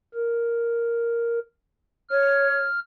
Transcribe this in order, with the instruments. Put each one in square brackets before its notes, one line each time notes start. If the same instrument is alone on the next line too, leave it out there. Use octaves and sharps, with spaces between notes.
[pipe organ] A#4
[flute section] C#5 [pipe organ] F6